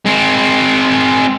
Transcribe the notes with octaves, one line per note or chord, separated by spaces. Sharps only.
G#3 C4